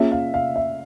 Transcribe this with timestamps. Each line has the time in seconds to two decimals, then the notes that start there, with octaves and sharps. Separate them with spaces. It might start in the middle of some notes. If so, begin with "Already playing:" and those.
Already playing: A#3 C#4 F4 G#4 C#5 E5
0.12 F5
0.34 F5
0.56 E5